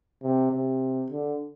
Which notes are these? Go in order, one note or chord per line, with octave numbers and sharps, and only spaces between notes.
C3
C3
D3